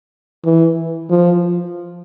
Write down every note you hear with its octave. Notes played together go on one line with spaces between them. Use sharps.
E3
F3